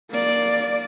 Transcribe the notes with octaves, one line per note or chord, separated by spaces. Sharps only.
A#3 D5